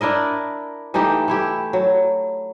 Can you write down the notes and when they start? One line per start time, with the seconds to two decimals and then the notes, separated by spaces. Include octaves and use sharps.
0.01 D4 E4 A#4 D#5
0.94 E3 A3 D#4 G4
1.28 A3 E4 G4
1.73 F#3